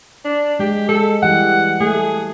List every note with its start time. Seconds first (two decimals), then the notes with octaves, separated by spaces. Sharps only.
0.25 D4
0.59 G#3 G4
0.89 G#3 A4
1.22 E3 G3 G4 F#5
1.80 A3 G#4